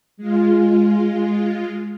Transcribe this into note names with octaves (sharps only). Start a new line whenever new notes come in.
G#3 F4